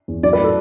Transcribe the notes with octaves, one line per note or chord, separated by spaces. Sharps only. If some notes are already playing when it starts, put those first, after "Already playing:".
E2
F#3 D5
B4
A2
A4